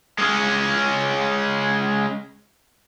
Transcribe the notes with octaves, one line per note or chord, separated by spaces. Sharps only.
G#3 C#4